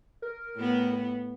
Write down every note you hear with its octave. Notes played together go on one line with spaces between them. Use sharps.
A#4
A2 B3